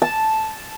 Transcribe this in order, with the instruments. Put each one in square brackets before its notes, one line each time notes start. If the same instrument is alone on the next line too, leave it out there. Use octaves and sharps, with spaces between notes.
[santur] A5